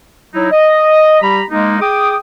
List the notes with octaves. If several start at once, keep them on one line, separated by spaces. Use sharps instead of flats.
F#3 D#4 E4
D#5
G3 G4 A#5 B5
G#3 A#3 D#4
G#4 G5 D6 D#6